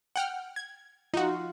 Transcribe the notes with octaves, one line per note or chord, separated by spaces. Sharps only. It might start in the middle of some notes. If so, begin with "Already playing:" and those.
F#5 G5 F6
G#6
D#4 F4 F#4